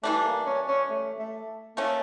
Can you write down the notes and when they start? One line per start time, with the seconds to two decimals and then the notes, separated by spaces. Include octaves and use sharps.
0.03 E3 G3 A3 D4
0.25 A#3
0.46 C#4
0.68 C#4
0.90 A3
1.18 A3
1.77 D3 A3 A#3 C#4